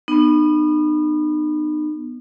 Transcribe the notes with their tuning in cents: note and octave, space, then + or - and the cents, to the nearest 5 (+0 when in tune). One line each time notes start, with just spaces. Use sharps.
B3 +0 D#4 -40